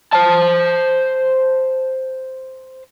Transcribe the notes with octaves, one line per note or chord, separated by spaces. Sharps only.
C5 A5